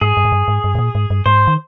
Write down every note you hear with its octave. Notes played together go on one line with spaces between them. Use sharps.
G#2 G#4
G2
G#2
G2
G#2
G2
G#2
A#2
G#2
G2
G#2 C5
D#3